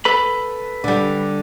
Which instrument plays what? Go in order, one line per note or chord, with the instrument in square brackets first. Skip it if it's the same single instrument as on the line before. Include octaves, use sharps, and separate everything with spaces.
[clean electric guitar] A4 B4 B5
[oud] D3 G3